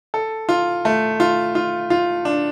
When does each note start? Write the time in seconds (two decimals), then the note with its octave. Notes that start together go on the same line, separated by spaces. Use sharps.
0.14 A4
0.49 F4
0.85 A3
1.20 F4
1.55 F4
1.90 F4
2.25 D4